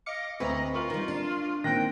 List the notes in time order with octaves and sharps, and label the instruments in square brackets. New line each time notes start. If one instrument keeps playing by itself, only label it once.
[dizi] D#5 [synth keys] F5 D6 C#7
[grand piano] D2 [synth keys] C4 A#5 [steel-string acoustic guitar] B4 [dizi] D#5
[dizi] F4 [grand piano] A#4 C#6 F#7
[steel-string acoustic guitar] D#3 G3
D4
[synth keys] A#2 D#3 [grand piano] C4 F#6 A#6 [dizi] G5